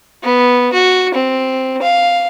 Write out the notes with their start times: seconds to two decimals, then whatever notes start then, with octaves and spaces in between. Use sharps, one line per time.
0.23 B3
0.73 F#4
1.14 C4
1.82 F5